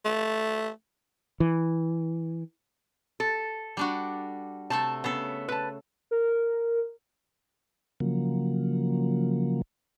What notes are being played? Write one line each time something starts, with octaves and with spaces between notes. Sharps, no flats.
A3
E3
A4
G3 D4 F#4
C3 A3 A4 A5
C#3 B3 A4
B4 A5
A#4
C#3 F3 F#3 A#3